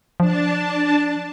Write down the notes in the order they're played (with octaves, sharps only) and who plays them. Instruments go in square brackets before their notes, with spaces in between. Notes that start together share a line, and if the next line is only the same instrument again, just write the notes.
[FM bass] F3 [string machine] D4 A5